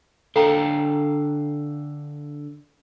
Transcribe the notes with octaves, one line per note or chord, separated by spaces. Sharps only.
D3 A4 F5 G5 A#5